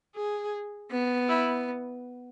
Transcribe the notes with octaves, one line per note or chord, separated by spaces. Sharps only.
G#4
B3
E4